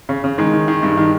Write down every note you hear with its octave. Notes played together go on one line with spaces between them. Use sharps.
C#3
C#3
D#3 G#3
D#3
D#3
G2
D#3